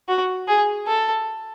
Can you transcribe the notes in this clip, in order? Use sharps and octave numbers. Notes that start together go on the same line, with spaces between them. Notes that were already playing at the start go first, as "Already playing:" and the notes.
F#4
G#4
A4